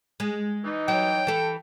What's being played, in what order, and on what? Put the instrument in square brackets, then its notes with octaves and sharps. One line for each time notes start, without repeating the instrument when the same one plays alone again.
[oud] G#3
[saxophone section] E3 D#4
[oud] F#3 [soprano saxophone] G5
[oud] E3 A4